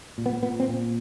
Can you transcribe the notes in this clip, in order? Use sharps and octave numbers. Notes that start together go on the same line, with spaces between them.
A#2
B3
A#2 B3
C4
A#2